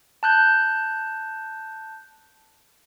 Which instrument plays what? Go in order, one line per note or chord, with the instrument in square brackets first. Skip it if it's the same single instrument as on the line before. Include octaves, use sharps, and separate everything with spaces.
[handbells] A5 F#6 G6